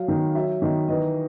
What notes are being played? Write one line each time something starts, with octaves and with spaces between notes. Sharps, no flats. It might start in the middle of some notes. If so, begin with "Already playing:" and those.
Already playing: F#3 F5
D#3
F#3 E5
D#3 D#5
E3 D#5